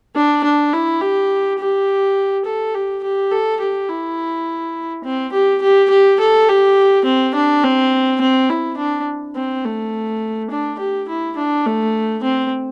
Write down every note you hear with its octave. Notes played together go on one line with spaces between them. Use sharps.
D4
D4
E4
G4
G4
A4
G4
G4
A4
G4
E4
C4
G4
G4
G4
A4
G4
C4
D4
C4
C4
E4
D4
C4
A3
D4
G4
E4
D4
A3
C4